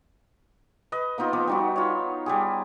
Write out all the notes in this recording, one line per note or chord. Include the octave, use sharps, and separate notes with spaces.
B4 D#5
A#3 B3 D#4 F4
F3 B3 D6
G3 D#4 F#4
F4 C#5
G3 G4 G#4